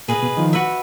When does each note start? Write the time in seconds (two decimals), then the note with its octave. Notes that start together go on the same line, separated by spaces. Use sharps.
0.08 A#2 G#4 B4 D#5
0.22 B2
0.37 D#3 F3
0.53 F#4 B4 E5